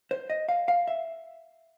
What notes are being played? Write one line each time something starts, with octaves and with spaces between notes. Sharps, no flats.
C5
D#5
F5
F5
E5